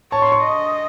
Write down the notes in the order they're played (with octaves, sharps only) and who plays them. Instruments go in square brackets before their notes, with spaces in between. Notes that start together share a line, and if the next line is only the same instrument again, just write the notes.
[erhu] C#5 [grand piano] A5
[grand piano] C6
C#6
[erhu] D#5